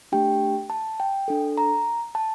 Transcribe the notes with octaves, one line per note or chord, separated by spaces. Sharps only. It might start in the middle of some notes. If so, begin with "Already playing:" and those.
A3 D4 G4 G5
A5
G5
D4 A4
A#5
A5